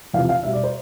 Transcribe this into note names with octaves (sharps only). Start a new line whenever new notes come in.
E2 C3 F3 F5
F5
B2 G3 E5
D5
C5